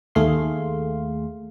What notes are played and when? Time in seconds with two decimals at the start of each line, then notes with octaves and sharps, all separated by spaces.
0.15 D#2 A3 G#4 F5 C6